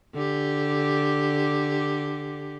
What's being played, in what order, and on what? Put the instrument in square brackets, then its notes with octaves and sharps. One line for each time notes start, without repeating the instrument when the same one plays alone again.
[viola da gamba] D3 G4